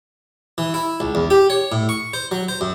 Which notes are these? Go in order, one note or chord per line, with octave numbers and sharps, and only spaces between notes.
E3
E4
C#2
E2
G4
C#5
A2
C#6
C5
F#3
C5
F#2